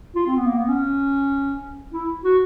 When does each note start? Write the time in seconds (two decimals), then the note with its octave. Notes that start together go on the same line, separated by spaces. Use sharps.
0.16 F4
0.27 C4
0.37 B3
0.47 A#3
0.58 B3
0.68 C#4
1.93 E4
2.24 F#4